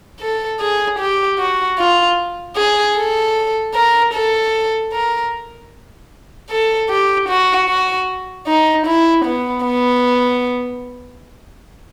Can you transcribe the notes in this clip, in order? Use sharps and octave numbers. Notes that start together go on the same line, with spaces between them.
A4
G#4
G4
F#4
F4
G#4
A4
A#4
A4
A#4
A4
G4
F#4
F#4
D#4
E4
B3
B3